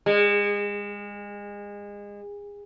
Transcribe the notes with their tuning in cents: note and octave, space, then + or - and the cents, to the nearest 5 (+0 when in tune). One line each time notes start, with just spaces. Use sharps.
G#3 -30